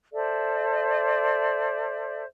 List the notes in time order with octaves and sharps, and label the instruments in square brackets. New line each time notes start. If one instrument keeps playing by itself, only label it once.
[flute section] A4 C5 D5 E5